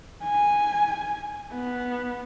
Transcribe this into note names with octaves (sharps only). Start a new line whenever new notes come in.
G#5
B3